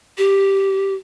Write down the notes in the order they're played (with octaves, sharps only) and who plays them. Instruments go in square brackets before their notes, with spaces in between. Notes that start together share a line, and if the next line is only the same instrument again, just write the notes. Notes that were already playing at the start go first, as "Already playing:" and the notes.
[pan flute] G4